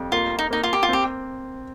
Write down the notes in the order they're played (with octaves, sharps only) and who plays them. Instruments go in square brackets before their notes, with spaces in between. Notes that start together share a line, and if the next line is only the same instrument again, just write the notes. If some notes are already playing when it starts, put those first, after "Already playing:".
Already playing: [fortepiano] F2 G3
[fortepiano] A#3 [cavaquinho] F4
[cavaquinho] D#4
[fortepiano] A#3 [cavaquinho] D#4
[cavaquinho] F4
G4
F4
[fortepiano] C4 [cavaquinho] G4